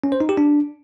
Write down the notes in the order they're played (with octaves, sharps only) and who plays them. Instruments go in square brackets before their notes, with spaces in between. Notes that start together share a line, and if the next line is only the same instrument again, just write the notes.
[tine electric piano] C#4
C5
D#4
G4
D4